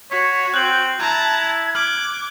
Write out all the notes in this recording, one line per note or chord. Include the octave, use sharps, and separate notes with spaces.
F#4 C#5 B6
C4 F#6 G6 F#7
E4 A5 A#5 G#6
D6 F6 F#7